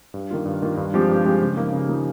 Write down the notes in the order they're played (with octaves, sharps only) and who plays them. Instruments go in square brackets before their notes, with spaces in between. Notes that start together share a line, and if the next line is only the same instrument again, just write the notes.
[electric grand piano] G2
D#3 A#3 F4
G2
D#3 A#3 F4
G2
F3 G#3 C4 G4
G2
F3 G#3 C4 G4
C#3
F3 A#3 D#4
C#3
F3 A#3 D#4